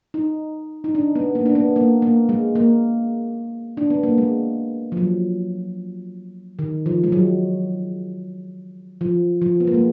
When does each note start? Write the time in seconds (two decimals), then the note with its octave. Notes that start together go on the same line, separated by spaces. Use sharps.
0.14 D#4
0.84 D#4
0.95 D4
1.15 B3
1.35 A#3
1.46 D4
1.55 B3
1.76 A#3
2.02 A#3
2.29 G#3
2.55 A#3
3.77 D4
3.90 B3
4.03 A#3
4.18 G#3
4.92 F3
4.97 F#3
6.59 D#3
6.86 F3
7.04 G#3
7.12 F#3
9.01 F3
9.42 F3
9.60 B3
9.67 A#3
9.74 G#3